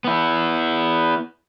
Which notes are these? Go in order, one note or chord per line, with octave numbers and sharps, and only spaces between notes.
B3 E4